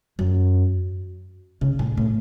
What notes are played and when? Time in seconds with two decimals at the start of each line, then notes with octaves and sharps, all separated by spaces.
0.19 F#2
1.61 C#3
1.79 A2
1.97 A2